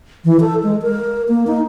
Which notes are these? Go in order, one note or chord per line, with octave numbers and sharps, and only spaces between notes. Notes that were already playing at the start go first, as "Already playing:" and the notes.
E3
A4
G#3
A#4
A#3
D#4